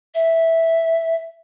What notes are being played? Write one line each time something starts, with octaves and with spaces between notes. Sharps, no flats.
E5